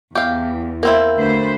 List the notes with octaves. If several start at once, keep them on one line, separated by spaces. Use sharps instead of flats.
E2 G4 F5
A#3 C4 E4 A#4
D2 B4 C5